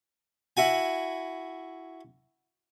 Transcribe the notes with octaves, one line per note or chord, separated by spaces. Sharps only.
E4 F#4 G#5